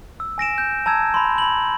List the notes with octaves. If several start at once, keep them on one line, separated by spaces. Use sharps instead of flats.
E6
G#5 A#6 D7 E7
G6
A5 A#5 E6 G#6 E7
B5 C6
B5 F#7